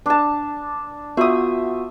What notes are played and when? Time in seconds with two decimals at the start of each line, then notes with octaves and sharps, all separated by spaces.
0.06 D4 A5
1.17 B3 F4 F#4 E5 D#6